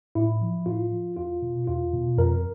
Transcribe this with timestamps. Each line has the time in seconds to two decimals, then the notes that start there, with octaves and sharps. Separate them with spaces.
0.15 A2 E4
0.41 F3
0.66 A2 F4
0.92 F3
1.17 E2 F4
1.42 B2
1.67 E2 F4
1.93 B2
2.18 F2 A#4